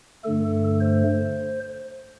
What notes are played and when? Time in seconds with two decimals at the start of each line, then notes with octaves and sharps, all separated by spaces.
0.24 G2 D3 A3 A4
0.81 C5